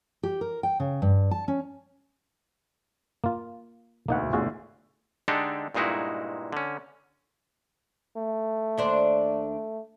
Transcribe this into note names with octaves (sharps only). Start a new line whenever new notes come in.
G4
A#4
G5
C#3
G2
A5
C#4
A#3 F4
E1 D2 A#3 D#4 F#5
G1 A2 D3 F4 F#4 G#4
D3 G#3 D4 D#4 G4 A4
G2 A#2 G#3 D#4 E4 F#4
D3 C#4
A3
D#2 D4 C5